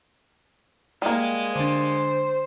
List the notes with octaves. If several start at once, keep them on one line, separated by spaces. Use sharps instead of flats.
G3 G#3 A#3
D3 D4 C5